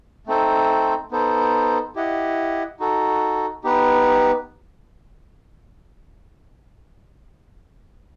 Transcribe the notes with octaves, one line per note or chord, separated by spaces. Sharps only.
A3 C4 D#4 A4 C5
B3 D#4 A4 C5
E4 G4 D#5 F#5
D#4 F#4 A4
B3 D#4 G4 B4